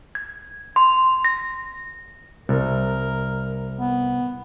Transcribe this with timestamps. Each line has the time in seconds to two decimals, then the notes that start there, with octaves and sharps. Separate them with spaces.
0.15 G#6
0.76 C6
1.25 A#6
2.49 C2 A#4
3.79 B3